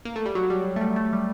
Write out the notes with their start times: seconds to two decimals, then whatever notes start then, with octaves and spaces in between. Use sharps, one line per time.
0.05 A#3
0.16 A3
0.25 G3
0.35 F#3
0.50 G3
0.76 A3
0.81 G3
0.96 A3
1.13 G3